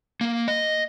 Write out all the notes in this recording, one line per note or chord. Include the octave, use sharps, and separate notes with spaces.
A#3
D#5